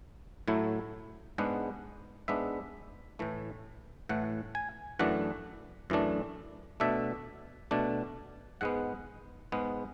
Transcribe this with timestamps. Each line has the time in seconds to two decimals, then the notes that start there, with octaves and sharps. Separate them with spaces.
0.48 A2 F#3 A3 E4
1.38 G#2 G#3 B3 D4 F#5
2.28 G#2 G#3 B3 D4 E5
3.19 A2 E3 A3
4.09 A2 E3 A3 F#5
4.55 G#5
4.99 F#2 E3 A3 D4 F#5
5.90 F#2 E3 A3 D4
6.80 B2 A3 D4 E5
7.71 B2 A3 D4
8.61 G#2 G#3 B3 F#5
9.52 G#2 G#3 B3